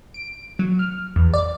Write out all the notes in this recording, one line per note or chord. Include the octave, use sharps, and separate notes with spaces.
D7
F#3
F6
E2
D5